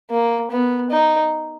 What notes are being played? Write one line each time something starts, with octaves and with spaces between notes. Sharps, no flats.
A#3
B3
D#4